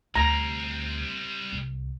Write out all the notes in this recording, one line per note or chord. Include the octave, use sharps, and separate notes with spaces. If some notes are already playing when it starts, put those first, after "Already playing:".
D2 G3 C4 A#5
C2